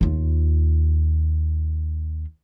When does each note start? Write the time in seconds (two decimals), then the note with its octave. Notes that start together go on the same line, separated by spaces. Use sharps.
0.01 D#2 F4